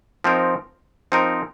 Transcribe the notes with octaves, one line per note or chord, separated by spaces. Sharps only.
F3 C4 D#4 A#4
F3 C4 D#4 A#4